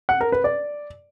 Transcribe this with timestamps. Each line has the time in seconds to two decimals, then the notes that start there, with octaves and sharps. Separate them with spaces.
0.09 F#5
0.21 A#4
0.32 B4
0.44 D5